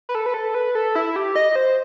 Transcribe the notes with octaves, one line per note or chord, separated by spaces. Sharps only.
B4
A4
B4
A4
B4
A4
E4
G4
D#5
C5